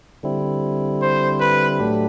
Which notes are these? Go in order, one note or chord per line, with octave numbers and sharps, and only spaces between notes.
D3 G3 C4 E4
C5
B4
A2 F#3 A3 D4 G4